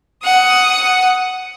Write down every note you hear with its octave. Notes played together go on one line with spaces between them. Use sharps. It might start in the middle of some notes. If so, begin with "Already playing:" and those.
F#5 D#6